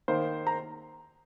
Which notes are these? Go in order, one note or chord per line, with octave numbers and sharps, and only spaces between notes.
D#3 A#3 C5
A#5